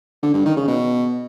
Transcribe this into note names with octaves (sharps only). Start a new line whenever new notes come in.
D3
G2
D#3
C#3
B2